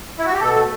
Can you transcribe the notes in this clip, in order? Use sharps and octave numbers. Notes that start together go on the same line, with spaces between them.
E4
F#4
G4
B2 A4
A3